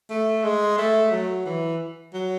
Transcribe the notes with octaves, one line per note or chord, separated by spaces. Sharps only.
A3
G#3
A3
F#3
E3
F#3